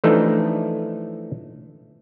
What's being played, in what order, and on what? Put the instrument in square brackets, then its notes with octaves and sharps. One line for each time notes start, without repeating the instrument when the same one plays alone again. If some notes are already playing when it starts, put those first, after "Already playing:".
[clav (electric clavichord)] E3 F3 A3 D4 D#4